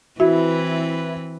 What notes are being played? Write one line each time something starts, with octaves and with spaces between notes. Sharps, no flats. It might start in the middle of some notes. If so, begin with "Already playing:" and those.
E3 C4 E4 F#4 B4